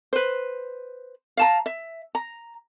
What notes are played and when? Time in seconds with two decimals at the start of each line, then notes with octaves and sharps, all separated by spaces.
0.13 B4 C5
1.37 F5 A5 A#5
1.66 E5
2.15 A#5